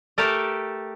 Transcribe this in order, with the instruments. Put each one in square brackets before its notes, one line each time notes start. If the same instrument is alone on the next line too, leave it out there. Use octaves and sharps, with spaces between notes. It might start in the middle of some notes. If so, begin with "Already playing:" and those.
[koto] A3 G4 A4 A#4 G#5